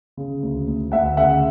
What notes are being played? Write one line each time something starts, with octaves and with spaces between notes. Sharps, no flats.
C#3
D2
D2
D2 E5 F#5
C#3 E5 F#5